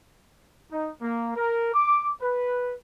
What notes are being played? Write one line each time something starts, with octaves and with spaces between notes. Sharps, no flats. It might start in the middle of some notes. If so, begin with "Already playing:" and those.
D#4
A#3
A#4
D6
B4